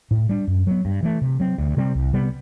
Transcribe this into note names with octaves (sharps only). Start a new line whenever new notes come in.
A2
G3 D4
F#2
F#3 B3
G2
E3 A3
C3
F#3 C4
D2
C3 G3 C4
C2
C3 G3 B3